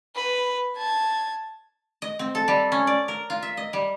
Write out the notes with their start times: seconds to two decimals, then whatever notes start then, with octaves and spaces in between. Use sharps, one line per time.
0.15 B4
0.77 A5 G#6
2.02 D#5
2.19 C4
2.35 A4
2.48 G3
2.72 C#4
2.87 D5
3.08 A#4
3.30 F4
3.43 E5
3.57 D#5
3.73 G3